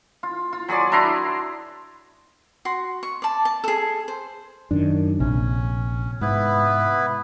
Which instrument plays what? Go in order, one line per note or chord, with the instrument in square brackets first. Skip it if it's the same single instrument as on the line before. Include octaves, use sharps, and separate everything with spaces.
[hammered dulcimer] F4
F4
F#3 G#4 D5 C6
D4 E4 A#5 C6
[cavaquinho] F#4 C6
C#6
D5 A5
A5
G#4 A4
C5
[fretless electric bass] F#2 D#3 [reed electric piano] D4
[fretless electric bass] A#1 [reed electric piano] C3 [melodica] C#4
[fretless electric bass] G#2 [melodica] B3 E4 B4